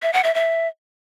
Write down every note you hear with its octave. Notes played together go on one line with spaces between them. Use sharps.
E5
F#5
E5
E5